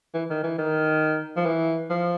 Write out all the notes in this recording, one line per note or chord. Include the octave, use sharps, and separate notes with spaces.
E3
D#3
E3
D#3
F3
E3
F3